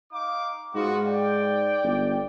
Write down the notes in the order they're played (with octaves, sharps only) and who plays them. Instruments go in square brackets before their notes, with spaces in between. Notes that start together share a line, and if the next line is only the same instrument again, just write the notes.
[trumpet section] D#4 F5 D6
[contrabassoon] G#2 [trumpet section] B3 F4 F#4
[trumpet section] D5 G5
[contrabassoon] G1